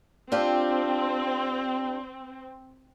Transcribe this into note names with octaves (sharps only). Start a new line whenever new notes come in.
C4 D4 F4 G4